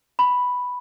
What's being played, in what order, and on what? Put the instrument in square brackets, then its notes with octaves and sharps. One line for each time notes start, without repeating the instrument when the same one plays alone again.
[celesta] B5